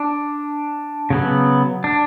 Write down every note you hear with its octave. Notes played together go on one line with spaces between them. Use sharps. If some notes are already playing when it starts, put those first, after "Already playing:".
Already playing: D4
C#3 F#3 B3
D4